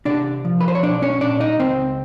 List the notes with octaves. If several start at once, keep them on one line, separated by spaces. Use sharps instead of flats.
C3 D4 D5
F3
B4
C5
C#5
B1 D4 D5
C#4 C#5
A#2 D4 D5
D#4 D#5
C#2 C4 C5